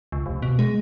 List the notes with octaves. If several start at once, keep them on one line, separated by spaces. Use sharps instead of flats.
C#2
F1
B2
G#3